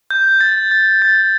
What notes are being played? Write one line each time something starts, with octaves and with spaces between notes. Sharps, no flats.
G6
A6
A6
A6